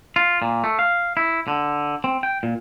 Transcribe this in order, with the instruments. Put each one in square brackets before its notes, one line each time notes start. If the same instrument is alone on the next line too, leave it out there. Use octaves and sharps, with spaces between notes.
[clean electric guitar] F4
A#2
A3
F5
E4
D3
C4
G5
A#2